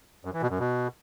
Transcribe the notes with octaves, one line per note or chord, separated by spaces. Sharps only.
F#2
E3
B2
F#2
B2